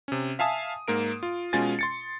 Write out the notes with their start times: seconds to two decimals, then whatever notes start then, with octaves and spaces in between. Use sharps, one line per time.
0.08 C3 C#4
0.39 E5 F5 G#5 A5 D#6
0.88 G#2 A#3 A#4 D7
1.23 F4
1.53 B2 G#3 C#4 F4 G#5 A6
1.79 C6 A6 C#7